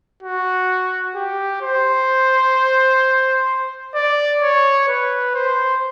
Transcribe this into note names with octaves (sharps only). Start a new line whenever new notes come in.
F#4
G4
C5
D5
C#5
B4
C5